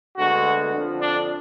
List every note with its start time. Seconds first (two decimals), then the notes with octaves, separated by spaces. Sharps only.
0.16 D2 D3 G#3 B3 F#4
0.73 F2 D3 F3
1.01 D4